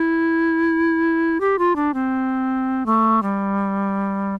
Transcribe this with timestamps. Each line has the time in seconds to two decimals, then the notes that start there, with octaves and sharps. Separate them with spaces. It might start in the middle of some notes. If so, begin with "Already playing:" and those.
Already playing: E4
1.41 G4
1.59 F4
1.76 D4
1.94 C4
2.86 A3
3.23 G3